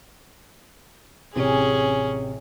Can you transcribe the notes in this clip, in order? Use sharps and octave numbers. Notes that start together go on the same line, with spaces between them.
A1 C3 C#4 G#4